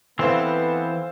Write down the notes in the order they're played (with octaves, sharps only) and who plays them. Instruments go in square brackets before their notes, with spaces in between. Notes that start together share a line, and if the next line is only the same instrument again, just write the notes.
[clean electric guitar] E3 C4 [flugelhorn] B3 [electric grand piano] A4 C5 F5